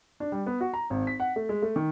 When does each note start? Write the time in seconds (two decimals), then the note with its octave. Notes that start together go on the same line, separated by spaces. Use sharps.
0.20 D4
0.32 G3
0.46 B3
0.60 F#4
0.74 A#5
0.90 G#1
1.07 B6
1.20 F#5
1.36 A3
1.49 G#3
1.62 A3
1.76 D#3